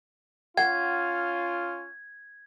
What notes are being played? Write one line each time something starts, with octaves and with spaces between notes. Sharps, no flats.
C#4 F4 F#5 G#6